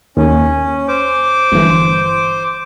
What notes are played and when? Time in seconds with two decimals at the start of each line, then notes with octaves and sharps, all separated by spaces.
0.17 D#2 C#4
0.88 C5 D6
1.52 G1 E3